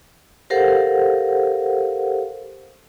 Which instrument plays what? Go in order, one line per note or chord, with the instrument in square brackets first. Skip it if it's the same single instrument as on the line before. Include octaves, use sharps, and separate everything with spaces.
[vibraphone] G4 A4 A#4 C5 F5 F#5